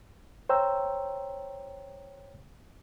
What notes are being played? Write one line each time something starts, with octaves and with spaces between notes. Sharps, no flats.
C5 C#5 G5 A#5 E6